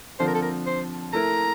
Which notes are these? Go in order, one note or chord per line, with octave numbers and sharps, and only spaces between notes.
D3 F3 C4 C5
A#4
A4
A#4
C5
A3 E4 A#4 A#5